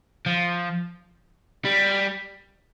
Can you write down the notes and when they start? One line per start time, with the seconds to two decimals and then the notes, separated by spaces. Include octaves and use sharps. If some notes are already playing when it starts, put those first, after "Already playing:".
0.26 F3
1.65 G3